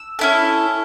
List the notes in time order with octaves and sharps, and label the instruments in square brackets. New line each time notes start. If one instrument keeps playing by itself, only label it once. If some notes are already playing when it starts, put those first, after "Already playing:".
Already playing: [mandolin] E6
C#4 E4 A4